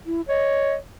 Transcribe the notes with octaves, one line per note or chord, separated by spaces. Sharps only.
E4
C#5 D#5